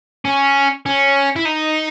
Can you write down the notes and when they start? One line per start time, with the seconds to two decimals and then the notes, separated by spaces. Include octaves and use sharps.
0.25 C#4
0.86 C#4
1.36 E4
1.45 D#4